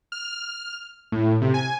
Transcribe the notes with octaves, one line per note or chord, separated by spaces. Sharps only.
F6
A2
C3
G#5